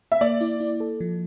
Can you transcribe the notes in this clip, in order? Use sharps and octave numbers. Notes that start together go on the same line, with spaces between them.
E5
A#3 D5
E4
E4
A4
F3